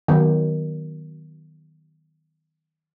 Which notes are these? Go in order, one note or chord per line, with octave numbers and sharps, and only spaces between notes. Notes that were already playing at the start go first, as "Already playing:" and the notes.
D#3 F#3 B3